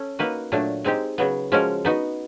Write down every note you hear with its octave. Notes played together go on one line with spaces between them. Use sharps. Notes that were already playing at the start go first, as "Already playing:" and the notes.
Already playing: C#4 A4
A#3 D#4 F#4 B4 D#5
A#2 F#3 A3 D4
G#3 C4 D#4 G4
C#3 F#3 B3
F3 G#3 C#4 F#4 A#4
B3 D#4 F#4